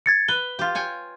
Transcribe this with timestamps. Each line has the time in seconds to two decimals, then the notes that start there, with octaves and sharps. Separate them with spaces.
0.06 G#6 A6 C#7
0.28 B4 G7
0.59 F4 G4
0.75 C#5 G5 G#5